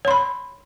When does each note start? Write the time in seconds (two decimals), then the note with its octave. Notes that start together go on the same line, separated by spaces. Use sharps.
0.05 C#5
0.08 C6
0.11 B5